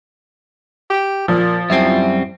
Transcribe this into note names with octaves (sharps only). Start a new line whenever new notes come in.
G4
A#2 F3
F#2 G3 C4 E4